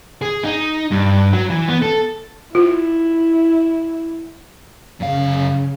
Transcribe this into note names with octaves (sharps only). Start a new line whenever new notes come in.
G#4
D#4
G2
F#3
E3
B3
A4
E4 F4
F#2 C#3 F5